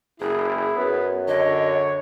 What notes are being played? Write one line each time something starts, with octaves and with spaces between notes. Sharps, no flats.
F#1 E4 G#4
F#2 B3
D3 C#5 D#5